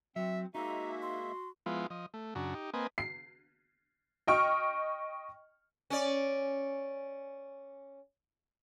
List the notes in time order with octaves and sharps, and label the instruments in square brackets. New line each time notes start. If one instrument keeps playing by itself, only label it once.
[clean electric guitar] F#3 [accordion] C4 [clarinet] E5
[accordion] G#3 A#3 E5 [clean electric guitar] D#4 [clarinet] F#4 [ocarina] A#5
[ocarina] C6
[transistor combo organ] F3 G#3 B3 E4 F4
F3 D#5
A3
F#2 C#3 D4 F#4 A#5
D#4 G4
A#3 C4 B4 D#5 G#5
[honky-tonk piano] C7
D#5 G5 C#6 F6
[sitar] C#4 D5